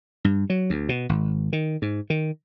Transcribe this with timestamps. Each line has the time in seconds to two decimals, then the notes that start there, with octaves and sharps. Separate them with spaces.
0.24 G2
0.50 F#3
0.70 D2
0.89 B2
1.09 G#1
1.53 D#3
1.82 G#2
2.10 D#3